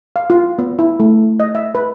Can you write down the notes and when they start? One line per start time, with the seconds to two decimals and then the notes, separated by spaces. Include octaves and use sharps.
0.16 F5
0.30 F4
0.59 B3
0.79 E4
1.00 A3
1.40 D#5
1.55 E5
1.75 B4